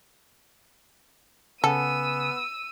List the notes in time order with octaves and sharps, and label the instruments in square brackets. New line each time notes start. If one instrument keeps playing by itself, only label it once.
[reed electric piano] C#3 F#5 G#5 [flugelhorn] B3 [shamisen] A4 [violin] E6 D#7